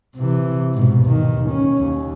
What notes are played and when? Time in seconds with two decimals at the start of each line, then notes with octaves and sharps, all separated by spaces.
0.16 C3 E3
0.74 G#2 B2
1.04 D#2 D#3
1.49 C#4
1.79 D#2